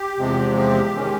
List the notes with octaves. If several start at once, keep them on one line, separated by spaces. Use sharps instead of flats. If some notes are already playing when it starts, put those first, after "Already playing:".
Already playing: G4
E2 C3 F3 G#3 C4
G4
D#3 G#3 C#4